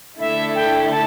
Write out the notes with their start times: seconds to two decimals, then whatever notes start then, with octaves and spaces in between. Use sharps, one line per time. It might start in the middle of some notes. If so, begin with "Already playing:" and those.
0.19 D3 A3 E4 A4 E5
0.55 G5
0.91 A5